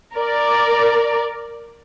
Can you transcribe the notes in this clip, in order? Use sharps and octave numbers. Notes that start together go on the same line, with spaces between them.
A#4 D5